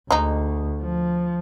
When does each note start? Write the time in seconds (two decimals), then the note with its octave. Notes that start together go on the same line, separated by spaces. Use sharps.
0.11 D2 G#3 D#4
0.82 F3